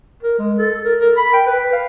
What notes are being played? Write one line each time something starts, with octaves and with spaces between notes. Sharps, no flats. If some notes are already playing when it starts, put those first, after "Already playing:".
A#4
G#3
A4
A#4
A#4
B5
G5
B4
F5